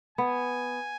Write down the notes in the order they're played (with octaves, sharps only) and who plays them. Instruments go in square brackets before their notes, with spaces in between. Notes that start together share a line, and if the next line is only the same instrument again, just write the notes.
[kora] B3 [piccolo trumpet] G#5